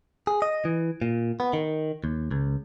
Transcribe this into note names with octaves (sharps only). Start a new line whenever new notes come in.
G#4
D#5
E3
A#2
B3
D#3
D#2
C#2